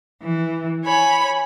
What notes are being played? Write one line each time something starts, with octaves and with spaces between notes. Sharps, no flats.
E3
C#5 G#5 B5